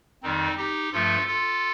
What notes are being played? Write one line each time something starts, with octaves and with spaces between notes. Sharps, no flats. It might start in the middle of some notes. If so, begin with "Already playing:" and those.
F2 D#3 G3 C4 D#4
D#4 G4
G2 F3 A3 F4 A4
F4 A4